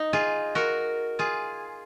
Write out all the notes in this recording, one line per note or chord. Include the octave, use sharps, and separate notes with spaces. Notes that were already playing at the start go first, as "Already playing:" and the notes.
Already playing: D#4
F4 G#4
F#4 A#4
F4 G#4